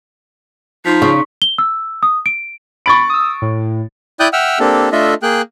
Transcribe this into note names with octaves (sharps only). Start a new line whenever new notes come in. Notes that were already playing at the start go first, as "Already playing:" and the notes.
F3 D#4 C6 B6
C#3 C#6
G7
E6
D#6
D7
B5 C#6 A6 D7
D#6 E6
A2
E4 D5 G5 D#6 F#6 G6
E5 F#5 G5 E6 F6
A#3 C4 D4 G4 A4
A3 D4 F4 A4 D#5 E5
A#3 G#4 G5 F#6